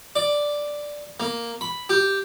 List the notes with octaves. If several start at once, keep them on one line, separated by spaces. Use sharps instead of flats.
D5
A#3
B5
G4